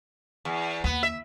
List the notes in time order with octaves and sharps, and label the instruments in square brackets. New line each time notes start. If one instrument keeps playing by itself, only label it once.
[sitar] E2
[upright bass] D#2 [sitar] B3
[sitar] E5